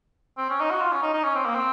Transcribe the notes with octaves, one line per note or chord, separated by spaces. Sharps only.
C4
C#4
D#4
F#4
F4
C#4
D#4
D#4
C#4
C4
A#3
C4